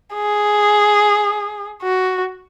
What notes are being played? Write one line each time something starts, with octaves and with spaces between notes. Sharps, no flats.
G#4
F#4